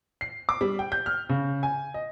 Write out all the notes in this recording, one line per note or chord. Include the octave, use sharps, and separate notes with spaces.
C7
D6
G3
G5
G6
F6
C#3
G#5
D#5